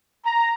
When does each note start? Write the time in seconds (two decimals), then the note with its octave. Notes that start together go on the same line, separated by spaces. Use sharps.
0.24 A#5